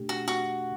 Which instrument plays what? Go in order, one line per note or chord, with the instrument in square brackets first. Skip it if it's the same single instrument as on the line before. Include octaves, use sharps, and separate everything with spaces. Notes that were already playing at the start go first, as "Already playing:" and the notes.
Already playing: [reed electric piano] B2 A3 D4 G4
[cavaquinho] F#4
F#4